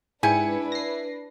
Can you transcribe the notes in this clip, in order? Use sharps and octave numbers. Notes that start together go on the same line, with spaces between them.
G#2 D4 E4 G4 B4 G#5 C#7
A#6 C7